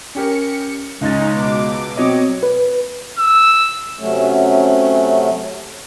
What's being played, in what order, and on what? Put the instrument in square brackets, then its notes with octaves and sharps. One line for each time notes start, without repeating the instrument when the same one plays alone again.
[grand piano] C#4 G4 A#4 [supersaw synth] C#7
[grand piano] C#2 A6 [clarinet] G#3 [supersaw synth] C#4 D#4
[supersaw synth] B2 D6
[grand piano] F#3 D#5 [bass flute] C4 [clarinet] C#5
[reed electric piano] B4
[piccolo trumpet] E6
[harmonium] C3 F#3 A3 C#4